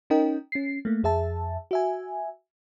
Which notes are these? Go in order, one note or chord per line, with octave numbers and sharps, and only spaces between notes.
C#4 D#4 A#4 D#5 G5
C#4 C7
A3 A#3
F2 G#4 E5 A5
F#4 E5 G#5